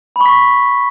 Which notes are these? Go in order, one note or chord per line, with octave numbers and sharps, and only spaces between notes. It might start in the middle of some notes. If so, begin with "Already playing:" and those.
B5 C#6 B6